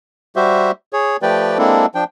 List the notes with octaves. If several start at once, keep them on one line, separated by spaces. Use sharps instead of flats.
G3 F#4 G4 C5 E5
G#4 C#5
F3 A3 G4 B4 D5 G5
G#3 A#3 C4 D4 E4 A4
F3 D4 G5